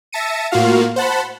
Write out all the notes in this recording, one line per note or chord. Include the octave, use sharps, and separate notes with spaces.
E5 A5 A#6 C#7 D#7
A2 A#3 F4 F#4 F5
C5 F#5 A5 B5